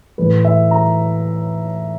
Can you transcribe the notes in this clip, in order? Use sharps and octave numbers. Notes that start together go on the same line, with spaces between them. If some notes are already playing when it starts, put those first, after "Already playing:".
A2 E3 A3 B4
E5
A#5